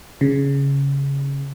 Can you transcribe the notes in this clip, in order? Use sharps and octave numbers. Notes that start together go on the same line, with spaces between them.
C#3